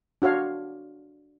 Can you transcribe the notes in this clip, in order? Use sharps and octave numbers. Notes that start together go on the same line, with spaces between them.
D4 F#4 C#5 F5